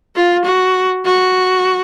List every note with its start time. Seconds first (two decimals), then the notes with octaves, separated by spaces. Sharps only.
0.16 F4
0.45 F#4
1.05 F#4